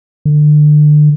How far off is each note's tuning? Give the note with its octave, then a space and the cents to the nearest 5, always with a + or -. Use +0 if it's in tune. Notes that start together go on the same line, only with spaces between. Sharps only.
D3 +30